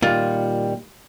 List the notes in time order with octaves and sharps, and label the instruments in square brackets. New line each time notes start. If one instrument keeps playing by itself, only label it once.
[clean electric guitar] A#2 D#3 G3 [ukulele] F4